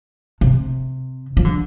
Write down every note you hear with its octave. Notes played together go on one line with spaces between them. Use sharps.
C3
F3
D3